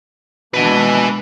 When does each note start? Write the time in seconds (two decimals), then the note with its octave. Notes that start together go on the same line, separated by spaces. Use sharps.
0.54 B2 G#3 A#3 D4 B4 G#5